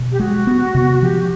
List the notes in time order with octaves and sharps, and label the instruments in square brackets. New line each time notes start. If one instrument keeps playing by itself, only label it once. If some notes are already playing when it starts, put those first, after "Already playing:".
Already playing: [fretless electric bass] B2
[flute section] G4
[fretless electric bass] G#3 [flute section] F#4
[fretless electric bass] B3
C3
[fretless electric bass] F3 [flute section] G4